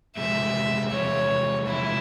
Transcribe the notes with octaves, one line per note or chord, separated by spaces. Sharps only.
E2 C3 F3 G#3 E5
E2 C3 F3 G#3 C#5
E2 C3 F3 G#3 E4